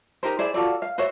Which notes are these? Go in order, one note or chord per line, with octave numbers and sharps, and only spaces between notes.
D#4 G4 A#4 C5
E4 G#4 C5 D5
F4 F#4 A4 D5
F5
F#4 C5 C#5 E5